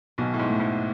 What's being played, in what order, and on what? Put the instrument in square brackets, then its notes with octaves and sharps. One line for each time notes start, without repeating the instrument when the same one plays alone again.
[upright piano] B1 B2 [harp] D#3
[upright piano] A2
G#2
[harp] A3 E4
[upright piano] G#2